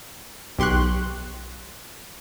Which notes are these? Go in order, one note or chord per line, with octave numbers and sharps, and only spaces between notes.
B1 G4 C6 C#6 F#6